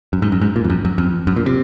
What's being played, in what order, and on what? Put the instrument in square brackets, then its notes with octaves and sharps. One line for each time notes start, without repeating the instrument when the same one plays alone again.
[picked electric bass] F#2
G#2
F#2
G#2
A#2
F2
F#2
F#2
F2
F#2
A#2
C3